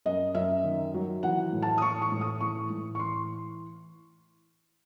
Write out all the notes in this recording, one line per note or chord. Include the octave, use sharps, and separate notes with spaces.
F#2 D#5
F#2 E5
D#3
F#3
E3 F#5
A2
A5
D#6
E3 C#6
C#6
A2
D#6
E3 C#6
A2
C#6
E3 C6